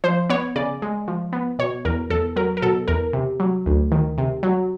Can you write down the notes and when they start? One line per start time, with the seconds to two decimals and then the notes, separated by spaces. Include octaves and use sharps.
0.04 F3 C5
0.30 B3 C#5
0.56 C#3 D5
0.82 G#3
1.08 F3
1.33 B3
1.59 B2 C#5
1.85 E2 A#4
2.10 E2 A4
2.36 F#3 A#4
2.57 A#4
2.62 B2 A4
2.88 E2 A#4
3.13 C3
3.40 F#3
3.66 D2
3.92 D#3
4.18 C3
4.43 F#3